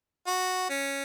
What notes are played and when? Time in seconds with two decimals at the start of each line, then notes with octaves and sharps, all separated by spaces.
0.27 F#4
0.70 C#4